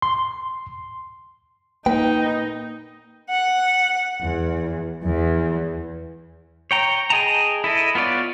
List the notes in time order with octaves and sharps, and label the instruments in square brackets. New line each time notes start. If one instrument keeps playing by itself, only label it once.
[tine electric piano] C6
[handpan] A#3 [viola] D#4 [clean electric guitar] B4 G5
[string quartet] F#5
E2
E2
[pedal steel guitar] C#5 G5 A#5
G#4 D#5 G5 A5 A#5
E4 A4 D#5
B3 F4 C#5 D5